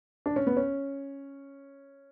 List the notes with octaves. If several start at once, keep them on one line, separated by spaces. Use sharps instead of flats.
D4
C#4
B3
C#4